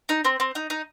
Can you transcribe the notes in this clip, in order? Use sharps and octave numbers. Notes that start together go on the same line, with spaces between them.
D#4
C4
C4
D#4
D#4